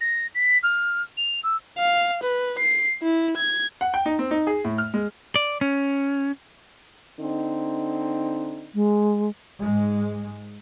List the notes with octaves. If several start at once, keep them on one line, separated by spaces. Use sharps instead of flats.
A#6
B6
F6
F7
E6
F5
B4
C7
E4
G#6
F#5
G5
D#4
C4
D#4
G#4
A2
F6
G#3
D5
C#4
D3 C4 D#4
G#3
G#2 G#3